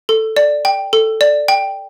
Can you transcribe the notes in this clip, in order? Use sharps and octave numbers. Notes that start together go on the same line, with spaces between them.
A4
D5
G5
A4
D5
G5